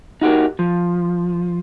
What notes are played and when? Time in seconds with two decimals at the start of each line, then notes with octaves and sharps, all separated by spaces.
0.21 D#4 F#4 G4 A#4
0.59 F3